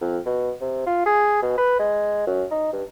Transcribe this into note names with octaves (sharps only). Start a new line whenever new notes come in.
F2
B2
C3
F4
G#4
B2
B4
G#3
F#2
D#4
G2